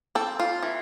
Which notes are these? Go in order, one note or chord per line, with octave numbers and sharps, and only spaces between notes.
C4 A4
F4
E3